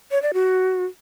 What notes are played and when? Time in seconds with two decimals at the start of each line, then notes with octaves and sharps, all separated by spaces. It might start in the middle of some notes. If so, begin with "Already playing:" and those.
0.11 C#5
0.22 D5
0.34 F#4